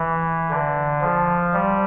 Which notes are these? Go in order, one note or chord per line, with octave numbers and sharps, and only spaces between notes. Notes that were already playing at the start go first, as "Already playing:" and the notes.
Already playing: E3
D3
F3
G3